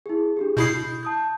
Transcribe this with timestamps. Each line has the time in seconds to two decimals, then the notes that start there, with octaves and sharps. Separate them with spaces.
0.06 E4 G#4
0.37 D4 G4 G#4
0.57 B2 E4 D#6 G6 C7
1.03 A5 D#6 G6